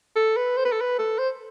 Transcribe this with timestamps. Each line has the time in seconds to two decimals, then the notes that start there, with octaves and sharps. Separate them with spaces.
0.16 A4
0.36 B4
0.57 C5
0.65 B4
0.72 A4
0.81 B4
0.99 A4
1.18 C5